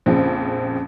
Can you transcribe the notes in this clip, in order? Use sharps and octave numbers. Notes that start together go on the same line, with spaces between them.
A#1 F2 C#3